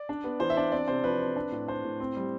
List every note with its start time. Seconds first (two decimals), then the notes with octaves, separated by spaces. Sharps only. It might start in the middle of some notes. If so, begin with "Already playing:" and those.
Already playing: D5
0.09 D4
0.24 B3
0.40 E3 C5
0.50 E5
0.57 D4 D5
0.72 C4 D5
0.88 C3 C5
1.04 F3 B4
1.20 C4
1.36 D4
1.52 A2
1.68 D4 C5
1.84 A2
2.00 C4
2.16 G3